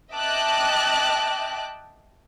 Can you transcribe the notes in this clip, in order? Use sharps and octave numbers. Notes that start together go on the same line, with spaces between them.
D#5 E5 G5 A5 D6 F#6